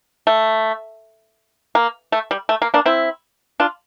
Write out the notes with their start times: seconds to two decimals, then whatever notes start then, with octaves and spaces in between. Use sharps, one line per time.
0.27 A3
1.75 A#3
2.12 A3
2.31 G3
2.49 A3
2.62 A#3
2.74 A#3 D4
2.86 C4 E4
3.60 D4 F4